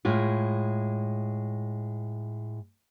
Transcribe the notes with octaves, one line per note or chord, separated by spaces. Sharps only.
A2 G#3 F4